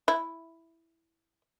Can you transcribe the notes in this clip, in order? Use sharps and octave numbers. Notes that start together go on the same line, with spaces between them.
E4